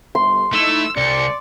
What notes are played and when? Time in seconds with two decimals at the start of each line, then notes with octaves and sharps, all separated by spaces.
0.15 G1 C2 C6
0.53 A3 D#4 E4 E6
0.97 C2 D5 C#7